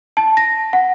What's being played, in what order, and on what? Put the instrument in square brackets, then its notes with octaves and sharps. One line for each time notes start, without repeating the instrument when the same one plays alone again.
[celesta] A5
A#6
F#5